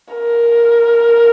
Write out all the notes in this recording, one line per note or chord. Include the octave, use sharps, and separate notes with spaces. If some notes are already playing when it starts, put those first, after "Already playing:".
A#4